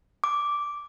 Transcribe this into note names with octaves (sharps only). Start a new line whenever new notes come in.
D6